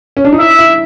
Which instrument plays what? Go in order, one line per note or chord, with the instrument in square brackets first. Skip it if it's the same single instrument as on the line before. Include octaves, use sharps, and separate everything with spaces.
[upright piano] C#4
D4
D#4
[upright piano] E4 [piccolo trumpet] E5
[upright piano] E4